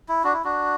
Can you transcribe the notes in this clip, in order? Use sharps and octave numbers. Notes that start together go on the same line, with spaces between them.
E4
D4 F#4
E4
D4 F#4